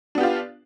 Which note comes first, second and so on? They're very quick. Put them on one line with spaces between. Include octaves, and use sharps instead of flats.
D4 B3 G4 F4